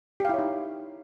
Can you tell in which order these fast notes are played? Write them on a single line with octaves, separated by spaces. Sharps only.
G4 F5 E4 C#5 D#4